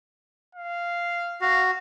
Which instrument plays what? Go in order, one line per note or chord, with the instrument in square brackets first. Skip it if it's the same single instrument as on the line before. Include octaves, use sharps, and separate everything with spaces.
[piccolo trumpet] F5
[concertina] F#4 [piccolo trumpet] F5